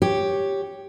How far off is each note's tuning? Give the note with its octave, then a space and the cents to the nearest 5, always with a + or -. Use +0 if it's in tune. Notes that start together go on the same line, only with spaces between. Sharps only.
G4 +0 C#5 +0